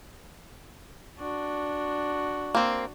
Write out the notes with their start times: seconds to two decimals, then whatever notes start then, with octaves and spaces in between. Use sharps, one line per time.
1.19 D4 F#4
2.55 A#3 C4